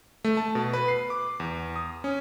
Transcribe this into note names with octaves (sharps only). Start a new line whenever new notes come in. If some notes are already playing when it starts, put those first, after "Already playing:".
A3
A5
B2
B4
C7
D6
E2
D#6
C#4